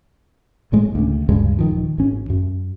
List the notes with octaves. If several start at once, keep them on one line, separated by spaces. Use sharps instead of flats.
G#1 A2 G#3
D2 C#3
D2 G2 C#3 G#3
D#1 D#3 F3
G#1 C#4
F#2